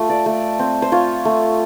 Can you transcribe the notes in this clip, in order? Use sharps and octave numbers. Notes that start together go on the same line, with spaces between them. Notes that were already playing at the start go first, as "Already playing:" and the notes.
Already playing: A3 F4
D5
A3
C4
C5
F4 C#5
A3